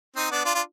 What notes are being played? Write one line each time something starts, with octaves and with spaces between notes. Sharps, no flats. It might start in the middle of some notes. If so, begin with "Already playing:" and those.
C4 D#4
B3 D4
D4 F4
D4 F4